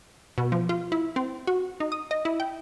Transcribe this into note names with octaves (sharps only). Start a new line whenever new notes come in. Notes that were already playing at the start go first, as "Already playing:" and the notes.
B2
F3
F4
E4
C4
F#4
D#4
D#6
D#5
E4
G5